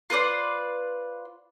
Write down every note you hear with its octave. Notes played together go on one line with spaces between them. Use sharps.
F4 B4 C5 D5